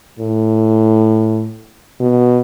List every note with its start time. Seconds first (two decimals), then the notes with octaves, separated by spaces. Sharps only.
0.19 A2
2.00 B2